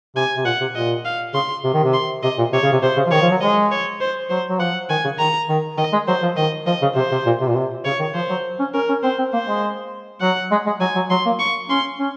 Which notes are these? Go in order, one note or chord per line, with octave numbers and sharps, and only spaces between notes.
C3 G#5
C3
A#2 F#5
C3
A#2 D#5
F5
C#3 C6
C3
D#3
C3
C6
C3 D#5
A#2
C3 C#5
C#3
C3
C3 C5
C#3
F3
D#3 C#5
F3
F#3
G#3 D#5
C#5
C5
F#3 C5
F#3
F3 F#5
D#3 G#5
C#3
D#3 A#5
D#3
D#3 D#5
G#3
F#3 C5
F3
D#3 D#5
F3 D#5
C#3
C3 C5
C3
A#2
C3
A#2
C3
C#3 C#5
D#3
F3 C5
F#3
C#4
C#4 A#4
C#4
C4 C5
C4
A#3 C5
G#3
F#3 F#5
G#3
G#3
F#3 G#5
F#3
F#3 C6
A#3
C#6
C#4 C6
C#4